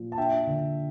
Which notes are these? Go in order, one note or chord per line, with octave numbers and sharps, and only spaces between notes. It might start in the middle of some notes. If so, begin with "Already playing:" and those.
Already playing: A#2 F3
A5
D4 E5 G5
D3